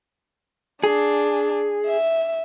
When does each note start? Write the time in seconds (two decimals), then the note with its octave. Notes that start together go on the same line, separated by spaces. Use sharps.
0.83 D4 G#4
1.86 E5